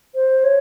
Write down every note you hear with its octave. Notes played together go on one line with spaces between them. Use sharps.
C5
C#5